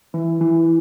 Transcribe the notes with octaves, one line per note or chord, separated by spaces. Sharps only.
E3
E3